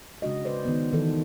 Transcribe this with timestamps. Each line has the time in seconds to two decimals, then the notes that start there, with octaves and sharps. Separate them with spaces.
0.22 C#3 G#3 D4 F#4 D#5
0.45 B4 C5 D5
0.65 D#3 B3
0.93 D#3 E3 A4